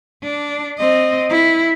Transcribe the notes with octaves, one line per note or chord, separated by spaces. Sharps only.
D4
C4 D#5
E4